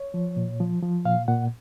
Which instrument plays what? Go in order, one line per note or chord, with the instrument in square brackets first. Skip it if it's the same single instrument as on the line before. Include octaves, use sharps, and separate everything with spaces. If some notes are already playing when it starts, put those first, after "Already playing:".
Already playing: [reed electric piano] C#5
F3
A#2
F3
F3
A#2 F5
A#2 F#5